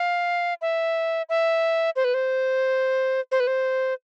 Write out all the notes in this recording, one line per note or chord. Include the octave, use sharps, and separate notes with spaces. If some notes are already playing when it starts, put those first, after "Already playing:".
Already playing: F5
E5
E5
C5
B4
C5
C5
B4
C5